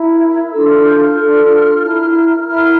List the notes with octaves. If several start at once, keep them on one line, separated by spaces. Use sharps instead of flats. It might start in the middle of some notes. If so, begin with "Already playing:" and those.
Already playing: E4 A#4
D4 F4 A4 E6
F6
G6
F6
D4 F4 A4
E4 A#4
E4 A#4 F6